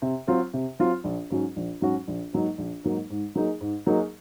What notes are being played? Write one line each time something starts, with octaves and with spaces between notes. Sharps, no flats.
C3
F#3 C4 F4
C3
F#3 C4 F4
A#1
G#2 F#3 C#4 F#4
A#1
G#2 F#3 C#4 F#4
A#1
G#2 F#3 A#3 D#4
A#1
G#2 F#3 A#3 D#4
G#2
F#3 A#3 D#4 G#4
G#2
F#3 A#3 D#4 G#4